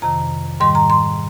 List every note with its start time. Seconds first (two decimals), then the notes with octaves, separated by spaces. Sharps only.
0.02 F2 C3 D#3 A#5
0.60 G#2 D#3 G3 C6
0.75 A#5
0.90 C6